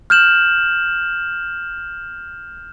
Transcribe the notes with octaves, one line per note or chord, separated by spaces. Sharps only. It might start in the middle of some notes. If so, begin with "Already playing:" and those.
F6 G6 E7 F#7